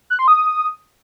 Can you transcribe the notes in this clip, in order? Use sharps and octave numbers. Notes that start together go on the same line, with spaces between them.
F#6
C6
D#6